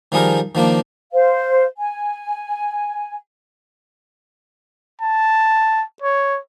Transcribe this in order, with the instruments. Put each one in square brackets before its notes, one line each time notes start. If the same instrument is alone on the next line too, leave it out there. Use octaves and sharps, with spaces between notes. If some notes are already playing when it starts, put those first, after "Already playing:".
[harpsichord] D#3 F3 G3 G#4 A#4
D#3 F3 A#3 D4
[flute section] C5 F5
G#5
[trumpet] A5
C#5